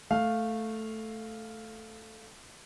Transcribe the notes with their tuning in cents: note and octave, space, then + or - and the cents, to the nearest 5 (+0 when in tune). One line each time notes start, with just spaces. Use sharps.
A3 +0 F5 +0